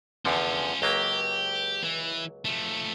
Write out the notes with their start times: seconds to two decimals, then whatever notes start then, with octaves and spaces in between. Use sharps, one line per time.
0.25 E2 D3 F3 C#4 F4
0.82 C#2 F#3 A#3 G4
1.83 E3
2.45 F3 A3